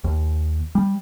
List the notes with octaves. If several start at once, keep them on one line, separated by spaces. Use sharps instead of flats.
D#2
G3